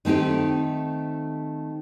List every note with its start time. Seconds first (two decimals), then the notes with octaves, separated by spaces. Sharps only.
0.05 D#3 A3 C4 D#4 G4